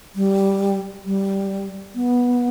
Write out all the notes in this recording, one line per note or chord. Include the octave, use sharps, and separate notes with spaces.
G3
G3
B3